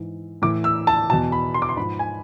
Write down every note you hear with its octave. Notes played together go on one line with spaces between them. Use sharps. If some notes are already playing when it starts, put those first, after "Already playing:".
Already playing: G#2 E3
A2 E3 D6
E6
A5
E2 B2 A5
B5
C6
D6
C6
G#2 F3 B5
G#5